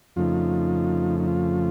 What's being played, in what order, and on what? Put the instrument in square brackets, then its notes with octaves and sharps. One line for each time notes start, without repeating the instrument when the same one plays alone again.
[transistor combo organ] F2 C#3 F3 A3 D#4 F4
D#4
F4